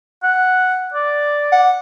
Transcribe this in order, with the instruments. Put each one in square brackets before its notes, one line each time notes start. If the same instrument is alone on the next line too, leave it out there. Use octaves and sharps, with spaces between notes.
[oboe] F#5
D5
[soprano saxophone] F#5